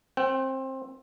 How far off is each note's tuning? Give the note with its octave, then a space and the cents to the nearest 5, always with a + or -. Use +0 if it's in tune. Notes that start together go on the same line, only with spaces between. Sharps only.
C4 +20 G5 -35